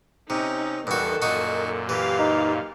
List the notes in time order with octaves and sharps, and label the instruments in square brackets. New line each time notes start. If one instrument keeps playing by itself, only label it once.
[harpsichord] C3 [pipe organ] C#4 [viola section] D#4
[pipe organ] E2 [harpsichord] G2 F#4 [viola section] D#3 A4
[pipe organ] F#2 A#2 [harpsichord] D#4 F#4
[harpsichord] E3 [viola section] G4 F5
[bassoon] D#4